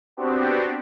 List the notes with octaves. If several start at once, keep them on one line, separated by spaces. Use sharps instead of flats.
B3 C4 D4 F#4 G4